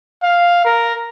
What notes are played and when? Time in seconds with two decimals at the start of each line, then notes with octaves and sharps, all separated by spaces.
0.23 F5
0.65 A#4